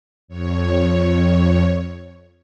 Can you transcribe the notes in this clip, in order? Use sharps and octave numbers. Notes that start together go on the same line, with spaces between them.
F2 C#5